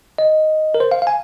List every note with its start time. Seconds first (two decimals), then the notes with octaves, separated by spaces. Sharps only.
0.18 D#5
0.75 A#4
0.80 C5
0.92 F5
1.02 F5
1.07 G#5